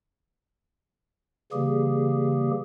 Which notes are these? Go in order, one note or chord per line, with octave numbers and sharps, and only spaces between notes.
C#3 E3 G3 A#3 G4 G#4